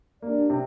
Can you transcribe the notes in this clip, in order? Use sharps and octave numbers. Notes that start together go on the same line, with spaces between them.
A#3 D4 G4 D5
C3